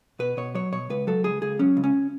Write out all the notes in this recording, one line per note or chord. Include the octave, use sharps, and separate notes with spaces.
B2 B4
B2 C#5
F#3 C#5
B2 C#5
C#2 B4
F#3 A4
C#2 G#4
C#2 G#4
F#3 C#4
C#2
C#4